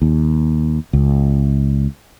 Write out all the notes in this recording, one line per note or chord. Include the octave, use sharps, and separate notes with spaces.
D#2
C#2